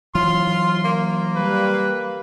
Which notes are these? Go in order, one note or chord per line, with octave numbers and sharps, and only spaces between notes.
E3 F#3 F4 C6
A#3
G3 B4